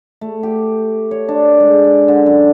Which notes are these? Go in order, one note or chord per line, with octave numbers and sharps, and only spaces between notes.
A3
G4
C#5
D4
G#3
D5
D3
F#2